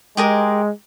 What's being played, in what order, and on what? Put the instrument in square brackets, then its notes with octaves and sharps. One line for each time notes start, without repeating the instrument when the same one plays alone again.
[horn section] G#3 [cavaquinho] G4 G#4 A#4